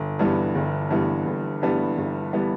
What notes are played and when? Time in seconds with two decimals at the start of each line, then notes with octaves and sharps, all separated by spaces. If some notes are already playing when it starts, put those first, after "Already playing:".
Already playing: G1
0.19 G2 E3 G3 B3
0.55 G1
0.90 G2 E3 G3 B3
1.26 G1
1.62 G2 E3 G3 B3
1.97 G1
2.33 E3 G3 B3